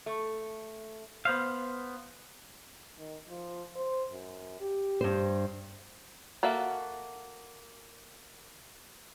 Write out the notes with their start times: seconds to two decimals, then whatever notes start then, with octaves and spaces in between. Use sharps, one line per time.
0.06 A3
1.25 B3 C5 F5
2.98 D#3
3.28 F3
3.76 C5
4.12 F#2
4.60 G4
5.01 G2 C5
6.43 A#3 F#4 A4 E5